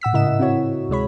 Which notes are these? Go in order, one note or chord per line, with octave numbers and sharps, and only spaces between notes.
A2 F#5 E6 B6
G#2 C#3 E4 A#4 D#5 E7
E4
C4 E4 F#4 C#5
D2 C3 G#3 C#5 B5